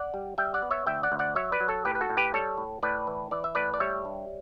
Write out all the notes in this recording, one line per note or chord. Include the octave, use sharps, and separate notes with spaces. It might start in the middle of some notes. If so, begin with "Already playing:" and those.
Already playing: D5 F#5
G3
G3 E5 G5
D5 F#5
B3
C#5 E5
D2 E5 G5
D5 F#5
D2
D5 F#5
F#3 C#5 E5
B4 D5
F#3
A4 C#5
A2 G4 B4
B4
F#4 A4
A2
G4 B4
G3 A4 C#5
A2
A2 B4 D5
E3
E3 D5
E5
A2 B4 D5
D5
G3 C#5 E5
G2